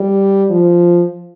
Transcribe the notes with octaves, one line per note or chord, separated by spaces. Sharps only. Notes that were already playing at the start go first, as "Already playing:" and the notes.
Already playing: G3
F3